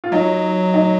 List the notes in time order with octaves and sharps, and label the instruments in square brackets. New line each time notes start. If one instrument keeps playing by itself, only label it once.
[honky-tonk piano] F4
[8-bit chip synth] F#3 [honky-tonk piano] D#4
[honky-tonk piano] D#4